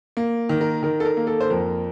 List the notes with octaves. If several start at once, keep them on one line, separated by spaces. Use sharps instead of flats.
A#3
D#3
A#4
D#3 A#4
A4
A#4
A#3
A4
C5
F2 A#4